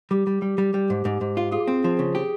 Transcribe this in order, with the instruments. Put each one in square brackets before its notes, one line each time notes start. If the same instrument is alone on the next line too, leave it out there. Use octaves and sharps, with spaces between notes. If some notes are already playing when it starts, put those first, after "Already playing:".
[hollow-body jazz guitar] G3 [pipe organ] G4
[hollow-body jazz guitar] G3
G3
G3
G3
G#2
G#2
G#2
F4
[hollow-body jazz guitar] F4 [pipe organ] G#4
[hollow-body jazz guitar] C4
F3
C#3
G4